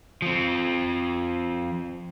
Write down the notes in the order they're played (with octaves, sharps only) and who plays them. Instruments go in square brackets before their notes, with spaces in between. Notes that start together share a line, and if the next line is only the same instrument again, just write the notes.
[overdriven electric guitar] F3 C4